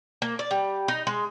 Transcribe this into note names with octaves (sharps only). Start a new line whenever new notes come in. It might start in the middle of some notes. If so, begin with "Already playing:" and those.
A#3
D5
G3
D#4
G#3